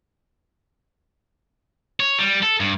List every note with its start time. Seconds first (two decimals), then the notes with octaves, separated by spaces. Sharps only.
2.00 C#5
2.19 G3
2.43 A4
2.60 G2